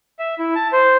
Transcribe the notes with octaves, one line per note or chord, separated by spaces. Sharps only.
E5
E4
A5
C5